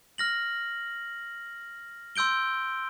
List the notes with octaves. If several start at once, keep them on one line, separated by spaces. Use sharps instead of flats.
F6 A#6 F#7
C6 E6 G6 D7 G7